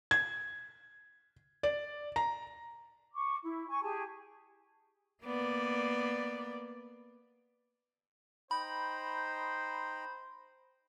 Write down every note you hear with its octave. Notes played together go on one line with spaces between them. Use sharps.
G#6
D5
A#5
C#6 D6
E4
G#5 C#6
G4 G#4 G#5 A5
A#3 B3 D5
D#4 C5 G5 A#5 B5